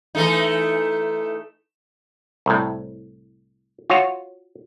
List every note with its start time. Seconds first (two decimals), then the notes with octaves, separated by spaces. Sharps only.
0.15 E3 A3 D#4
2.46 C2 A2
3.90 F4 F#4 C#5